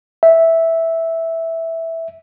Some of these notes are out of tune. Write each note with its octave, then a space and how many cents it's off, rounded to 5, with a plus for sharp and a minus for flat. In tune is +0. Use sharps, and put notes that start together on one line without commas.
E5 -5